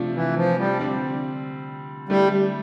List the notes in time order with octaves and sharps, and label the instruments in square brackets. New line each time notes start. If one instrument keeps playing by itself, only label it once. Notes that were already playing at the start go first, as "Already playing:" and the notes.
Already playing: [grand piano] C3 F3 A3 D4 F4
[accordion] E3
F3
G3
[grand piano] D3 G3 C4
[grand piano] D3 A3 E4 [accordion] G3